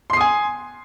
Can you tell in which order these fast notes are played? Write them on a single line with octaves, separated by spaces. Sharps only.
C6 C7 D#6 G#5